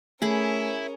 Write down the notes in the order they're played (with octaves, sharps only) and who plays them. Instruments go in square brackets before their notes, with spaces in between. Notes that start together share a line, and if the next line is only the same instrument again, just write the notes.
[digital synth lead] A3 [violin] C#4 A#4 [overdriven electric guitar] E4 [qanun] G#4 B5